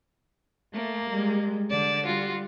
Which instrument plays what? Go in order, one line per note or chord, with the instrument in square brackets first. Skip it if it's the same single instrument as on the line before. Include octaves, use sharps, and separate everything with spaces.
[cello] A3 [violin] A#3
[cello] G3 G#3
[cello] D3 [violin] D5 E7
[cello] G3 [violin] F4 F#4